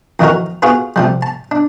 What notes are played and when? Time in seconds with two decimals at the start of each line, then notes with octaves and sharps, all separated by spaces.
0.19 F2 D#3 E3 D#4 F#4 A#4
0.62 B3 F4 F#4 G#4 B4
0.96 C3 F3 G3
1.22 A5
1.51 D4